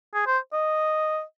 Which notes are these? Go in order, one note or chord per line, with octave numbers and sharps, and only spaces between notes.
G#4
C5
D#5